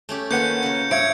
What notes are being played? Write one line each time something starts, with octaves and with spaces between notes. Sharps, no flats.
A3 C#4 G4
D#3 A#3 C#4 F4 B4 F#5 G6 C#7
C#3 A#4
G2 C#5 E5 F5 G#6 C#7 D7